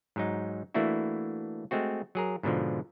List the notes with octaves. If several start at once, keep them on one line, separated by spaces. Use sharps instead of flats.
G#2 F#3 D#4
E3 A3 A#3 D4 E4 F#4
G#3 A3 C4 F#4
F#3 G#4 A#4
G#2 B2 D3 F3